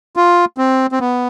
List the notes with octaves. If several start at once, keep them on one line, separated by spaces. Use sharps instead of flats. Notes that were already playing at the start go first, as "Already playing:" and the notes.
F4
C4
C4
B3